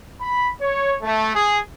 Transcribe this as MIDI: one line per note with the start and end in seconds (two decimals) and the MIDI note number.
0.21 0.50 83
0.61 0.94 73
1.02 1.33 57
1.34 1.59 68